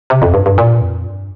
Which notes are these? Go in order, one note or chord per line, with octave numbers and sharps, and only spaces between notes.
C3
F2
G2
G2
A#2
F2
G2